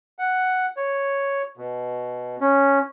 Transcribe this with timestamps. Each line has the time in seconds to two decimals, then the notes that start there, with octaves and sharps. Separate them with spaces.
0.19 F#5
0.77 C#5
1.58 B2
2.41 C#4